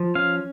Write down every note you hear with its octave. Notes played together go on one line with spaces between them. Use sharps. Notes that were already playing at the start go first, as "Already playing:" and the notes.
Already playing: F3
C#4 F5